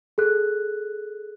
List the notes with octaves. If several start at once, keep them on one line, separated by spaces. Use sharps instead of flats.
G#4 A4 F#6